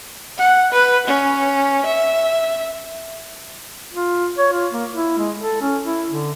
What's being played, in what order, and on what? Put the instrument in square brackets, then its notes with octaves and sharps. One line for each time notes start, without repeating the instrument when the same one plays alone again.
[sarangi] F#5
B4
C#4
E5
[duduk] F4
C#5
F4
A#3
E4
G#3
A4
C#4
E4
D3